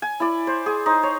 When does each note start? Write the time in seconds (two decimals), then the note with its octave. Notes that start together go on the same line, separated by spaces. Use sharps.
0.02 G#5
0.20 E4 D5
0.47 C5
0.66 G#4
0.86 D#4 C5
1.03 C#5